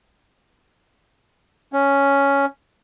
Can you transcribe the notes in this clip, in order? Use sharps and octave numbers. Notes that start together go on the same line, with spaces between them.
C#4